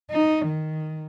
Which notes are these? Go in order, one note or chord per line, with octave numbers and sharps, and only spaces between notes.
D#4
D#3